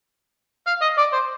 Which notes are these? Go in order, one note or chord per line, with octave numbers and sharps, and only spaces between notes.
F5
D#5
D5
C5